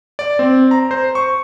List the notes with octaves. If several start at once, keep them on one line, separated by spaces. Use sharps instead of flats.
D5
C4
A#5
C5
C#6